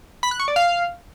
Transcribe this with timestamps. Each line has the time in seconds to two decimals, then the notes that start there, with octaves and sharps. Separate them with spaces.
0.23 B5
0.31 F#6
0.40 C#6
0.48 D5
0.56 F5